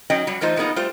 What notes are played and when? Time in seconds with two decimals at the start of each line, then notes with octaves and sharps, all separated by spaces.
0.10 F#3 C#4 D#4 D#5 G5
0.27 F#3 G3
0.41 E3 A3 D#4 F4 C5
0.56 G3 G#3 A#3 B3 D#4 F4
0.76 G3 A3 F4 C5